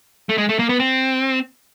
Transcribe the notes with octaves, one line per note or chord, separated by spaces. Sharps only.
A3
G#3
A3
A#3
B3
C4